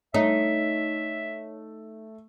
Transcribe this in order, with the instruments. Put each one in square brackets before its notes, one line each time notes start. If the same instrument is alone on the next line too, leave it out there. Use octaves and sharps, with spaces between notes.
[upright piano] A3 [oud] D#4 [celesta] C#5 [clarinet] E5